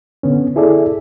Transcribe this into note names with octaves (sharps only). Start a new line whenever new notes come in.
D3 B3 C#4
E4 G#4 A4 D5 E5